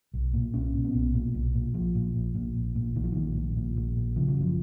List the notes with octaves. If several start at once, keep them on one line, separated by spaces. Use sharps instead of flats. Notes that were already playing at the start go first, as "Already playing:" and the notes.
B1
A#2
B1 C#4
A#2
B3
B1
A#2
B1
A#2
A#1 F3
A#2
A#1
A#2
A#1
A#2
A#1 D#3
F3
A#2 D#3
A#1
A#2
A#1
A#2
C#3 F3
F#3
F#1 F3